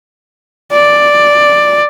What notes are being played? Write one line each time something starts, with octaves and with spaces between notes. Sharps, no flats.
D5